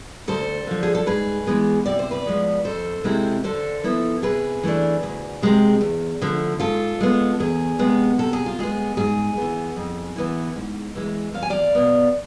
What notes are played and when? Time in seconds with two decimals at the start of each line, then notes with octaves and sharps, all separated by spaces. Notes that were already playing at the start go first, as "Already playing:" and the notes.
0.28 D2 A4 C5
0.67 D3 F3
0.83 G#4
0.95 A4
1.06 G#2 G#4 B4
1.47 E3 G#3 B3
1.86 C3 D5
1.99 C5
2.11 B4 D5
2.26 F3 G#3 B3
2.64 F2 A4 C5
3.04 C3 G#3 C4 E4
3.44 D3 A4 C5
3.84 F3 B3 E4
4.23 C3 G#4 B4
4.63 E3 A3 D4
5.03 D2
5.42 C3 G#3 C4
5.81 E2
6.21 D3 F3 A3
6.60 G#2 F4 A4
7.01 G#3 B3
7.40 E2 G#4
7.79 C3 G#3 B3
8.18 C3 A4
8.33 G#4
8.46 F4
8.59 G#3 B3 G#4
8.97 G#2 G#4
9.37 E3 B3
9.76 F2
10.16 E3 B3 E4
10.56 G#2
10.95 E3 G#3
11.34 E2 F5
11.43 G#5
11.50 D5 F5
11.75 B2 B3